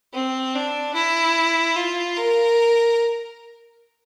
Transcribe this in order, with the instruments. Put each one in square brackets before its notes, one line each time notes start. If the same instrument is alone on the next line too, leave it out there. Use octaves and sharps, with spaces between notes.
[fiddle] C4
D4
E4
F4
A#4